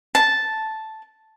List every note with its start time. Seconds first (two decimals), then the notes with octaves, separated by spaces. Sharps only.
0.15 A5